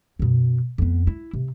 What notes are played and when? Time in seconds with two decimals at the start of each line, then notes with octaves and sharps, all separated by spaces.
0.19 F#2 B2
0.78 F2 B3
1.07 E4
1.33 C3